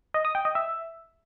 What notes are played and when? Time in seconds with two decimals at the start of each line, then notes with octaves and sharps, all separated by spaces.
0.14 D#5
0.25 D#6
0.35 G5
0.45 D#5
0.55 E5